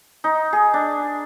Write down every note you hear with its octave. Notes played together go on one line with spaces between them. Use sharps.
D#4
G#4
D4